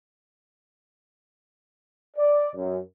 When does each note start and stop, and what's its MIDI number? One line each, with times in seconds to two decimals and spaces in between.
2.17 2.50 74
2.55 2.79 42